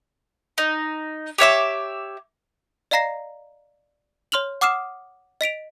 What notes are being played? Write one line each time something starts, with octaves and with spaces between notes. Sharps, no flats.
D#4
G4 C#5 E5 D6
D5 D#5 F5 A#5 A#6 C7
C#5 C6 F6 F7 F#7
F#5 D6 D#6 F6 C7 E7
D#5 B6 D7 F7